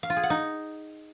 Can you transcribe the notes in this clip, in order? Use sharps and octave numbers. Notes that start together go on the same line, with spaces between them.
F5
F4
G#4
F#5
D#4